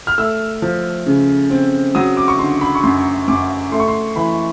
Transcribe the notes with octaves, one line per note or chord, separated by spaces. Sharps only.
F6
A3 E6
F3
C#3
C4
F#3 D#6
D6
C#6
D3 C6
B5
C#6
F#2 C6
F#2 D6
A3 C6
C#6
C6
E3 B5